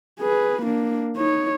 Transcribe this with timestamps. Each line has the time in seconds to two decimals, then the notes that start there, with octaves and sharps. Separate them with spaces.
0.20 G#4 B4
0.63 A#3 D4
1.17 D#4 C#5